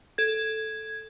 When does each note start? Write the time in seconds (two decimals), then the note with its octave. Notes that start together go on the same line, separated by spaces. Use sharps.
0.18 A4 G#6